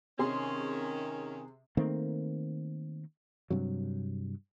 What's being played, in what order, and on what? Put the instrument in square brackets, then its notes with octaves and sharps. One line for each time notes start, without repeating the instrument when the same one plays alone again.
[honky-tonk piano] C3 G#4 C6 [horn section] D#3 C#4
[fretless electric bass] D#3 A3 A#3 C4
G2 C3 F#3